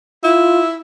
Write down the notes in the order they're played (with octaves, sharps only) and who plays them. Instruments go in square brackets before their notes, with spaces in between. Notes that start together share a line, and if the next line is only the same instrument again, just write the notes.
[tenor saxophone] E4 [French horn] F4